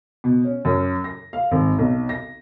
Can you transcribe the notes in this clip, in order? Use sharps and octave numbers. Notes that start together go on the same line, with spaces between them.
B2
C#4
F#2
A#6
F5
G#1
B1
A#6